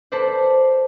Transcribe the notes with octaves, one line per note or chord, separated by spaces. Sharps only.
A4 B4 C5 D5